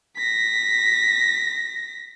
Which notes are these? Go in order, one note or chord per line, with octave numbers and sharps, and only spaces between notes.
A#6 B6